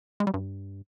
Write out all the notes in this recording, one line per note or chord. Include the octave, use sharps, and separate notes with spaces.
G#3
G3
G2